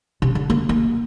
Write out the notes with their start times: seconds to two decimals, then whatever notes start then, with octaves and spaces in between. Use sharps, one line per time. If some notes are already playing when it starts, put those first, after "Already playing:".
0.22 C3
0.35 D3
0.50 A#3
0.69 A#3